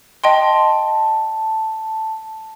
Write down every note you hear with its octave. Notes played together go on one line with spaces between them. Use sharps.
D#5 G5 A5 C6